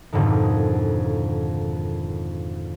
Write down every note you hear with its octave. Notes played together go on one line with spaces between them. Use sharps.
F2 G#2 B2 D3 D#3